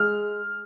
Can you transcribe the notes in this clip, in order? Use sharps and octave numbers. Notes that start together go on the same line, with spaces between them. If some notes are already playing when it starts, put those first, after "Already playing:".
Already playing: G#3 F6